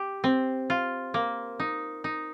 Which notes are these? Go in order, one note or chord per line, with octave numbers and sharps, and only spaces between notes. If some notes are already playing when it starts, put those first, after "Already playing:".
Already playing: G4
C4
F4
A#3
D#4
D#4